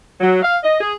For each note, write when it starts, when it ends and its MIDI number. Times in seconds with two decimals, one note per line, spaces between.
0.20 0.39 54
0.42 0.56 77
0.64 0.76 75
0.80 0.94 68